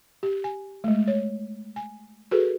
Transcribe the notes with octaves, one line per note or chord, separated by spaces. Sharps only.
G4
G#5
G#3 A3
C#5
G#5
F#4 G#4 A4 B4